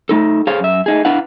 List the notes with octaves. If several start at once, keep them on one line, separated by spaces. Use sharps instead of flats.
A3 D#4 A4
G#4 A4 C5 C#5 F5
F#2 E5
A3 D#4 G#4
D4 E4 B4 F5 F#5